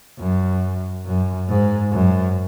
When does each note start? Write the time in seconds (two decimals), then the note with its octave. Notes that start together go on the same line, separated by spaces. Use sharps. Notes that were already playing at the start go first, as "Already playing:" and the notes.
0.19 F#2
1.06 F#2
1.49 G#2
1.92 F#2